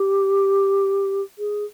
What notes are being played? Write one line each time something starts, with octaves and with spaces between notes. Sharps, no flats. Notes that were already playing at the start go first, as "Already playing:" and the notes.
Already playing: G4
G#4